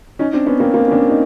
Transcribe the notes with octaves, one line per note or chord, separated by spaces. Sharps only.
C#4 D#4
C4 D4
B3 C#4
A#3 C4
A#3 C4
C#4
C4 D4
C#4 D#4